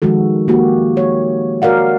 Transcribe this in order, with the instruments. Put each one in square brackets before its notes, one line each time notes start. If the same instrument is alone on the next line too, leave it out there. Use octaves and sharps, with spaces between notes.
[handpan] D#3 F3 G#3 F#4 A4
A#3 F#4 G4
G4 C#5
F#4 A#4 D5 F5 F#5